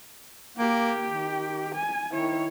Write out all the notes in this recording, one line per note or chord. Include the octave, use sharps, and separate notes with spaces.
A#3 G4
D#3
G#5
D#3 E4 C#5